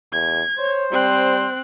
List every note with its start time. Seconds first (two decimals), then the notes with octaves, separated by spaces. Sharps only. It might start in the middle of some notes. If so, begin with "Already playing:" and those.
0.12 E2 G#6
0.59 C5 C#5
0.92 G3 C4 F#6